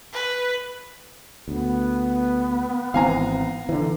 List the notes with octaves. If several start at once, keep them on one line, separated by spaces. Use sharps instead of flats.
B4
D2 B3
G#1 E3 C4 F5 G#5 A#5
D3 E3